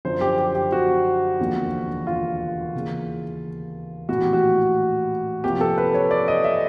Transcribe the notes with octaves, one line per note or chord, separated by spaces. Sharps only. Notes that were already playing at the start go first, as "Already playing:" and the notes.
F#2 D3 F3 C5
G4
G4
G4
F#4
E1 D#2 D3 F3
F4
D#2 C#3 E3
A#1 A2 E3 F#4
G4
F#4
C2 C3 F3 A#3 G4
A4
B4
C#5
D5
D#5
E5